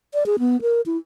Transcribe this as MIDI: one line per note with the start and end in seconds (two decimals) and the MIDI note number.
0.14 0.26 74
0.26 0.36 68
0.39 0.61 59
0.62 0.81 70
0.86 0.97 64